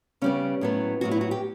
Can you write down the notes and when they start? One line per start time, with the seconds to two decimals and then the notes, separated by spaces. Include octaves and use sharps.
0.22 C#3 G3 B3 C#4
0.61 A2 F#3 B3
1.01 A2 F#3 B3 F#4
1.11 E4
1.21 F#4
1.31 G4